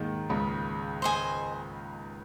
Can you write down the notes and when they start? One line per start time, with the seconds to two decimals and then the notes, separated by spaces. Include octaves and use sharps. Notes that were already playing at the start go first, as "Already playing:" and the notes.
Already playing: D#2 G#2 D#3 G#3
0.29 C#2 C#3
1.02 C5 D#5 G#5